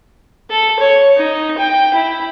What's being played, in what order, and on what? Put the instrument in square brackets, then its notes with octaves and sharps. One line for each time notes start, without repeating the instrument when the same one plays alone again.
[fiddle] A4
C#5
D#4
G5
E4